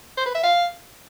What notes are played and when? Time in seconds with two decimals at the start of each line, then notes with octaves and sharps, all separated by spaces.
0.17 C5
0.26 B4
0.35 E5
0.43 F5